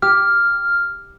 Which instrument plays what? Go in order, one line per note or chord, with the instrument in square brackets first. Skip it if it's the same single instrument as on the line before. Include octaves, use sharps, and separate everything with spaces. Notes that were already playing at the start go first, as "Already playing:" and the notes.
[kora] G4 [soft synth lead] F6